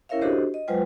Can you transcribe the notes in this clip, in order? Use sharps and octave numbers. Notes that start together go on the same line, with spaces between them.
C#4 E4 A#4 C#5 E5 F5
D4 F#4 G4 A4 C5 D#5
D#5
F#3 G#3 F4 B4 C5 G5